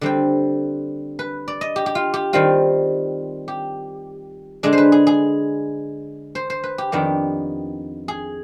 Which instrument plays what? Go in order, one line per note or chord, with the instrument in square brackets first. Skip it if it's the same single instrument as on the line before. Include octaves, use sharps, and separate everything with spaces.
[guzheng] D3 G3 C4 G5
B4
D5
D#5
G4
G4
F4
G4
D#3 G3 C4 F4
G4
D3 G#3 D4 G#4
C5
B4
G#4
G#4
C5
C5
B4
G4
F2 D#3 B3 D4 G4
G#4